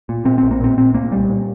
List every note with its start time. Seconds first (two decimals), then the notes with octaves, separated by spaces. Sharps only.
0.09 A#2
0.25 A#2 C4
0.38 C4
0.43 A#1
0.51 A#3
0.60 A#2 C4
0.77 A#2 C4
0.94 C2 A#3
1.11 A#2 G3
1.29 A#2